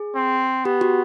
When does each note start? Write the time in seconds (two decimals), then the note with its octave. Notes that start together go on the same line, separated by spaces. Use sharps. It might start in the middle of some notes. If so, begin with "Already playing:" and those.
Already playing: G#4
0.15 C4
0.65 B3 G4
0.81 F#4